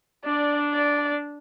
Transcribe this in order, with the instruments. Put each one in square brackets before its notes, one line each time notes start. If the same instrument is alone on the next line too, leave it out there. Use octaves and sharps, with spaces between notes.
[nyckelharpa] D4 [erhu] D5
[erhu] D5